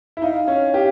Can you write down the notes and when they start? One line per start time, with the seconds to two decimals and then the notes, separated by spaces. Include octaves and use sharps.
0.17 E4
0.22 D#4 F5
0.48 C#4
0.74 G4